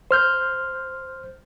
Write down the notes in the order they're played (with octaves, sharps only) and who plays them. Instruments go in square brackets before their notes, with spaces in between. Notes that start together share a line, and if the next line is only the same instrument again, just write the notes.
[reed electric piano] C5 F6 G6